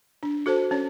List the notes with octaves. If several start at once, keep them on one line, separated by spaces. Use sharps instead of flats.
D4
F#4 A4 C5 A5
C#4 C#5